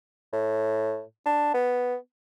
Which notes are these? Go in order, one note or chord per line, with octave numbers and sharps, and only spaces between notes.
A2
D4
B3